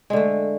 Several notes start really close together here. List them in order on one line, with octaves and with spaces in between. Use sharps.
G#3 D3 A3